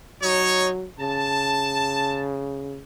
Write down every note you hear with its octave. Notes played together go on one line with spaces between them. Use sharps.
F#3 D#4 C#5
C#3 A5